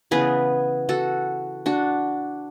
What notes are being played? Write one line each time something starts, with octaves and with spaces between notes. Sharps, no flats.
C#3 E3 B3 G#4 B4
F#4 A4
D4 F#4